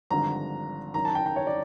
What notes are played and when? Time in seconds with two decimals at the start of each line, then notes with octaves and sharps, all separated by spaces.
0.10 G#1 G2 D3 F3 A#5
0.94 F#1 F#2 D#3 A#5
1.05 A5
1.15 G5
1.26 G5
1.36 C#5
1.47 D5